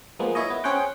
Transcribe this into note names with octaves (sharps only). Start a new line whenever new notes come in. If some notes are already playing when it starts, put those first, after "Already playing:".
F3 G#3 A#3 B3
E4 C#5 D#5
B3
C#4 G#4 C5 C#5 F#5 G5